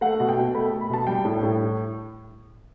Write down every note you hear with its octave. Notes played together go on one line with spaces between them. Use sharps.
A3 F#5
B2
G5
B2
A3 B5
A3
B5
B2 A5
G3 G5
A2
A2